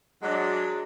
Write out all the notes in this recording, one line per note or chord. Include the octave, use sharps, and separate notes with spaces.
F#3 G#3 D4